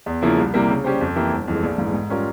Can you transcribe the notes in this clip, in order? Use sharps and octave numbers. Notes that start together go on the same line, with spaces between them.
E2
C#3 F3 A#3 E4
C2
C3 G3 A#3 E4
C#3
G3 C#4 G4 C5
F2
E3 A#3 E4 G4
G1
F2 E3 G#3
A#1
G#2 E3
G#2
G3 C#4 F4 A#4